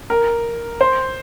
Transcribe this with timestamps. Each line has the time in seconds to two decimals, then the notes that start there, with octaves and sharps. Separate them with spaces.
0.10 A#4
0.81 C5